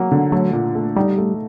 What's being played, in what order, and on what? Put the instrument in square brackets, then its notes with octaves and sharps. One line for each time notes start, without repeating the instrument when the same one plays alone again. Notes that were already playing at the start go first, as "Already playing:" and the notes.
Already playing: [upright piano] F#3 A#3
D3
[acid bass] F#3 [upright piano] A3
[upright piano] A#2
A3
[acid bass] G3 [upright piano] D#4
[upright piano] A3